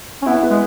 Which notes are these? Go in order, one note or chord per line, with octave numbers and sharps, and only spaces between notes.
C#4
B3 E4
B3
G#3